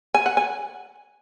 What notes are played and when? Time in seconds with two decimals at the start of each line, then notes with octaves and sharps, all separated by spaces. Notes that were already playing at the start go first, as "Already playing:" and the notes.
0.14 G#5
0.26 F#5
0.37 G#5